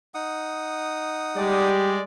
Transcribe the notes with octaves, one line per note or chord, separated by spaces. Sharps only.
D#4 F#5 D#6
G3 G#3 G4 D5